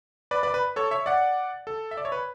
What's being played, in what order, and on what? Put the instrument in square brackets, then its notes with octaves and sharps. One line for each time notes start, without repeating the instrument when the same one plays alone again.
[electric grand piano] B4 D5
B4 D5
B4
A4 C#5
C#5 E5
D5 F#5
A4
E5
D5
C#5
B4